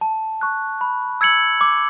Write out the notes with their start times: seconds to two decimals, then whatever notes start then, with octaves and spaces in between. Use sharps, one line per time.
0.01 A5
0.41 C#6 F#6
0.81 B5
1.21 E6 G#6 C#7 F#7
1.61 D6